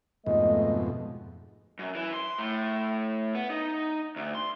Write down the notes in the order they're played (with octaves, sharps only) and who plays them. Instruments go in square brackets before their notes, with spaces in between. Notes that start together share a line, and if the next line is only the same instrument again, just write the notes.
[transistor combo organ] F2 G#2 B2 [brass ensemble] A3 D#5
[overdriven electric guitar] F#2
E3
C6
A2
B3
D#4
D2
C6